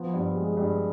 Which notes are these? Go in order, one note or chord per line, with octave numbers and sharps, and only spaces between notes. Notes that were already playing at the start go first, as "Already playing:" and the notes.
Already playing: F3 B3
G2
G#3
G2